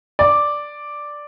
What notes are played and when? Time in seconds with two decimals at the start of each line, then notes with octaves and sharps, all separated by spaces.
0.19 D5